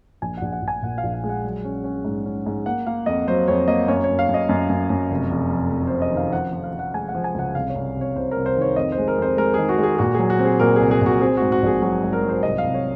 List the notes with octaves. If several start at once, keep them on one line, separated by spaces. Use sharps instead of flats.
A#1 G#5
A#1 F#5
F#5
A#1
G#5
A#2 F#5
F5
A#1
F5
G#3
F#5
F#3
C#4
C#4
G#2
C#4
G#2
A#3 F#5
A#3 F5
F2 D#5
F#3 C5
F2 C#5
A#3 D#5
F#2 C#5
F#2 C#5
F5
F#2
D#5
F#2
F#2
F#2
F1
F1
F2
F2
C3 C5
D#5
D#3
F5
F3 F#5
F3
F5
F3
F#5
G#3 G#5
F#5
F3
G#5
C#2 F#5
C2 F5
C#5
C2
C3
C#5
C2 C5
C2 A#4
C5
D#3
C#5
F2 D#5
C5
G#3
A#4
F2 C5
G#3 A#4
D#3 G#4
F#4
G#3 G#4
G#4
A#2 F#4
F#3 G#4
F#4
C4
G#4
A#2 A#4
C2 G#4
G#4
A#2 F#4
C4 G#4
G#2 F#4
F#4
A#1 G#4
F#3 F#4
G#2
A#4
F#3
C5
C2 D#5
F5
C2
C#5